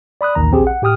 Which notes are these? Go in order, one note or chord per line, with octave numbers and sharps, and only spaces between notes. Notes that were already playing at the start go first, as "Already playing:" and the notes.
D5 B5 D#6 F#6
A1 D#2 D#3 A#5
A#1 C4 G4 G#4
F#5
A2 G4 G5 D#6 F6